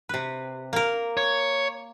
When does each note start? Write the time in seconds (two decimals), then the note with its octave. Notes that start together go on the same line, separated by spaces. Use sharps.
0.09 C3 B4
0.73 A#3 A#4
1.17 C#5